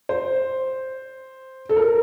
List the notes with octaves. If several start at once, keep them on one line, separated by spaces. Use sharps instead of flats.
C5
A4
A#4